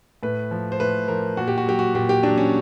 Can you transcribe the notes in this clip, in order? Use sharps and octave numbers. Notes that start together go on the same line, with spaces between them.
A2 B4
F3
C5
A2 B4
F3 A#4
A#2 F#4
G4
F#4
F#3 G4
F#4
A#2 G4
G4
F#3 D4
C#4